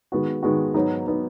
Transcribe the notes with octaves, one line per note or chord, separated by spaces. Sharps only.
D#3 G#3 B3 F#4
D#3 G#3 B3 F#4
G#2 F#3 B3 D#4
F#3 B3 D#4